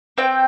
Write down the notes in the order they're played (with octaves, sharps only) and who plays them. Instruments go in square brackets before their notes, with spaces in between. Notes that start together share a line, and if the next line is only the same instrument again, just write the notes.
[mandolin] C4 G5